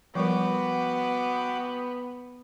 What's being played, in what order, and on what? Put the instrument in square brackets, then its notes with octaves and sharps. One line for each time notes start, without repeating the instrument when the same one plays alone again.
[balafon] F3 G3 A#4 [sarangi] B3 [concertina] F#4 G5 D6